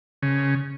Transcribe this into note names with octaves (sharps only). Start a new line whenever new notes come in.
C#3